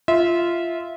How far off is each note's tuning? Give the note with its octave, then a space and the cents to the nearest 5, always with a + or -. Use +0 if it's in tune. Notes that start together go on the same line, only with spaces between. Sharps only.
F4 -15 E5 -20